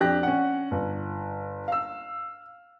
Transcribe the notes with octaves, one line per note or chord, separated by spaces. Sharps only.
F2 D4 G4 D5 F#6 A#6
C#4 F#5
G1
F5 E6